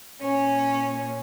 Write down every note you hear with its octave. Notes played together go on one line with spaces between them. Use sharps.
A#2 C#4 C#5